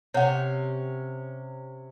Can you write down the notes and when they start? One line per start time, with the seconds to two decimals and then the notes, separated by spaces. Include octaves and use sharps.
0.14 C3 C#4 C#5 F#5